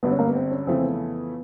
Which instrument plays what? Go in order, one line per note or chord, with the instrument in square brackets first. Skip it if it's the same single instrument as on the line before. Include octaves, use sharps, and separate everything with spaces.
[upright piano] G#1 G2 D3 [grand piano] B3
[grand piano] C#4
A#3
B3
C4
C#4
[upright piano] F2 C#3 E3 A3 [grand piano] C4
[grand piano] B3